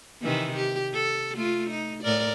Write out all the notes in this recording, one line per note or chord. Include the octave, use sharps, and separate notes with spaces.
C3 D#3 E3
G4
A4
A3 F4
D#4
A2 A#4 D5